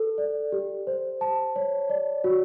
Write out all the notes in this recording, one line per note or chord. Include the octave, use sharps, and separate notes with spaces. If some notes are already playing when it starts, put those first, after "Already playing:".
Already playing: A4
D5
G4
C5
A5
C#5
D5
F#4